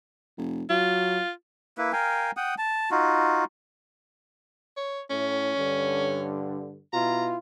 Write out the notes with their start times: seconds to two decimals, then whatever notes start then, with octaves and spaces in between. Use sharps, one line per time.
0.38 F1
0.70 F#3 F4
1.78 A#3 E4 B4
1.93 A#4 F5 G5 G#5
2.37 F#5 G5 D#6
2.58 A5
2.91 D#4 F4 F#4
4.77 C#5
5.10 A2 C#4
5.57 G2 D3
6.93 B2 E4 F4 A#5